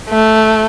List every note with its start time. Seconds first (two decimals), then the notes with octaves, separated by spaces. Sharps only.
0.10 A3